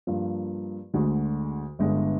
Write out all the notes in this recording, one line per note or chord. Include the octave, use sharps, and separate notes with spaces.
G2 F3 A#3 F4
D2 D3 G#3
G1 G2 D3 G#3